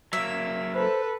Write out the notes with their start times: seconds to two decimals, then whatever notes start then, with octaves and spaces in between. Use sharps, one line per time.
0.13 F#3 A#3 E5
0.74 A4 B4 C5